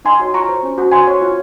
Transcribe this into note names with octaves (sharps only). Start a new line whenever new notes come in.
D#4 G#5 C6
F#4 C#5
F4 A#5 C#6
C5
C#4
F#4 C5
F#4 G#5 C6
C#5
F4